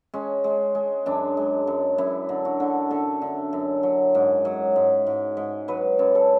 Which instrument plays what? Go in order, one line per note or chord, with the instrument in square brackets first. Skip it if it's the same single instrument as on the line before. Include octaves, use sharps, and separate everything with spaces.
[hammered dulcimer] G#3 C#4
G#3
G#3
F#2 D4
G#3
F#2
F#2 E4
D3
F#4
D3
D3 A4
D3
F#2
F#3
G#2
F#3
G#2
G#2
G#2
F#3 B4
F#2
A4